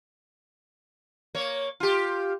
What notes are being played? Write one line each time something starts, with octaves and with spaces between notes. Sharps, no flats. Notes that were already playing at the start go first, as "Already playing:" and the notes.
A#3 C#5
F4 G4